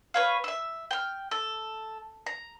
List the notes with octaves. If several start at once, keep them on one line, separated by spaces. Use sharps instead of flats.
B4 C#5 F5
E5 E6
G5 F6
A4
A#5